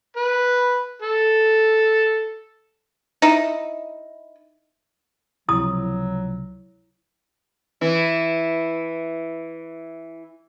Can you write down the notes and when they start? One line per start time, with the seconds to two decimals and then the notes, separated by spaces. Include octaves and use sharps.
0.16 B4
1.02 A4
3.22 D#4 E4
5.49 C#2 C3 F3 F#3 E4 D#6
7.81 E3 E4